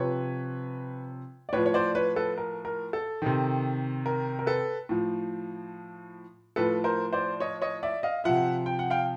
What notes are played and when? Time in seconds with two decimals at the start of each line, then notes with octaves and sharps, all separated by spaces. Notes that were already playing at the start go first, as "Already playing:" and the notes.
Already playing: C3 F3 B4 C#5
1.49 D5
1.53 A2 F3 B4 C#5
1.66 C#5
1.74 C5 D5
1.95 B4 C#5
2.16 A4 B4
2.38 A#4
2.65 A#4
2.93 A4
3.22 C3 D#3
4.06 A#4
4.39 A#4
4.46 A4 B4
4.89 A2 F3
6.56 A2 F3 A4 B4
6.84 A#4 C5
7.13 C5 D5
7.40 C#5 D#5
7.62 C#5 D#5
7.83 D5 E5
8.03 D#5 F5
8.24 C3 F3 E5 F#5
8.66 G5
8.79 F#5
8.90 F5 G5